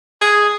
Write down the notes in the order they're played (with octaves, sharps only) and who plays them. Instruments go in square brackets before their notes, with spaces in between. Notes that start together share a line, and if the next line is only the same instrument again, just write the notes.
[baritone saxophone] G#4